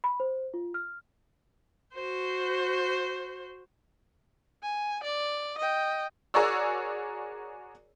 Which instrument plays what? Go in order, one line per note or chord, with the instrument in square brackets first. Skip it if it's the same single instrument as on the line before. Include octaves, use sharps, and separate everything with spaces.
[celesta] B5
C5
F4
F6
[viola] F#4 C5
[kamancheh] G#5
D5
D#5 G5
[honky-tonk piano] F#4 G#4 A#4 C#5 D5 E6